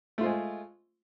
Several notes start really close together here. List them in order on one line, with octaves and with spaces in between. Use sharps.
A3 F4 C5 G#3